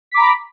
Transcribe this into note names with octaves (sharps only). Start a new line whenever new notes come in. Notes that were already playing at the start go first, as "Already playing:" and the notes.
A#5 B5 D6 B6